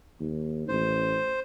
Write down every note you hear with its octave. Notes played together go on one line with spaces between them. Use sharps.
D#2
A1 C5